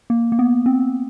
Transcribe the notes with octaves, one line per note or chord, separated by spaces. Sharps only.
A#3
A#3
B3
C4